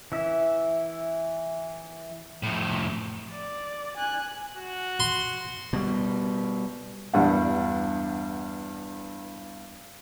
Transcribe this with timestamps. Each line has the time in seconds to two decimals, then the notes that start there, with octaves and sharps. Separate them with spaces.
0.12 E3 E5
2.43 F2 A2
3.31 D5
3.97 G#5 F#6
4.57 F#4
5.00 C6
5.73 B2 G3
7.13 E2 G2 G3 D4 F#5